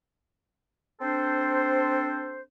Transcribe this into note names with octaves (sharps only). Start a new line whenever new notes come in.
C4 D4 A4 C5